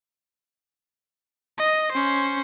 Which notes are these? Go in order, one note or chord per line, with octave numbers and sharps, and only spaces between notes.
D#5
C#4 C5